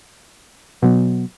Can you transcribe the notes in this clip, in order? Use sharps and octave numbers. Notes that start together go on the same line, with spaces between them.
B2 F#3 B3